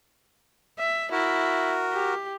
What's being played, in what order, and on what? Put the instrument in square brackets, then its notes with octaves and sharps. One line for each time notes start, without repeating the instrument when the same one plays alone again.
[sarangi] E5
[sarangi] E4 [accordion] F#4 A#4
[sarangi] G4